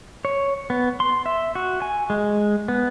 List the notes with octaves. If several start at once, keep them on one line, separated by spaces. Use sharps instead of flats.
C#5
B3
C6
E5
F#4
G#5
G#3
B3